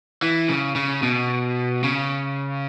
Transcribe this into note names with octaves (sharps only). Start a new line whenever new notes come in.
E3
C#3
C#3
B2
C#3